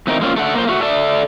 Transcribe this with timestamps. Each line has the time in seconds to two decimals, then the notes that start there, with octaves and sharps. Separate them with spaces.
0.07 E2 A3 C4 D#4 A#4
0.21 G#3 A#3 C4 C#4 F4
0.36 A3 A4 F#5
0.55 A#3 C5
0.67 A3 F4 F#4
0.83 A4 D5 E5 A5